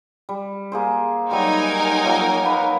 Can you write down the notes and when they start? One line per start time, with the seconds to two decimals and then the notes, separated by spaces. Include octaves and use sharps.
0.29 G3
0.72 A#3 G#4 C5
1.31 F#3 G3 D#4 A#4 G#5
2.04 F3 F#3 A#3
2.44 A#3 B4